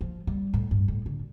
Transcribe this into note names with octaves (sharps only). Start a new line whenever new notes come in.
F3
G3
A2
G2
A2
D3